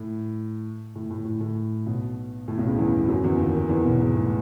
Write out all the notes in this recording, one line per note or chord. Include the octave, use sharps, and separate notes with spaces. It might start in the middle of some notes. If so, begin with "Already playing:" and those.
Already playing: A2
A2
A2
A2
A2
B1 B2
A2
B1 B2
C#2 C#3
E2 E3
F#2 F#3
E2 E3
D#2 D#3
D#2 D#3
E2 E3
B1 B2
G#2
A2